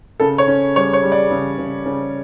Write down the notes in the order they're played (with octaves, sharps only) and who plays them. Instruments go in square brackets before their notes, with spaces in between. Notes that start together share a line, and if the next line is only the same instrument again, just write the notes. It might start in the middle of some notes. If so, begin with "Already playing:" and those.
[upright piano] C#3 A4
C#5
C#4
G3 C#5
C#5
G3
D5
C#3
C#3
C#3